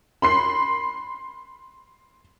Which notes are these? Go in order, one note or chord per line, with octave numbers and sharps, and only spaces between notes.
B5 C6 C7